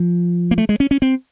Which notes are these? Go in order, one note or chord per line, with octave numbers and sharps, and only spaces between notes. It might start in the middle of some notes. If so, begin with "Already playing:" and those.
Already playing: F3
A#3
A3
G#3
C#4
C#4
C4